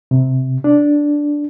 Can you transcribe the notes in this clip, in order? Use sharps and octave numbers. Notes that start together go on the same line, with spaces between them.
C3
D4